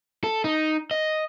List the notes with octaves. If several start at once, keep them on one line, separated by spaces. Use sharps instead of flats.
A4
D#4
D#5